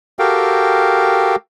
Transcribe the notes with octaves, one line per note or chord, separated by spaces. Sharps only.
F#4 G4 A4 A#4 F5 G5